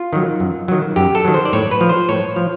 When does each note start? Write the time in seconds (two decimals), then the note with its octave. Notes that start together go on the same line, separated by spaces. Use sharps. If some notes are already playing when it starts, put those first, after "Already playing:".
Already playing: F4
0.13 D#3 F#3
0.40 F#2
0.68 D#3 F#3
0.96 F#2 G4
1.15 A4
1.25 D#3 F#3
1.34 C5
1.45 D5
1.53 A2 C#5
1.71 B4
1.81 F3
1.89 C5
2.09 A2 C#5
2.36 F3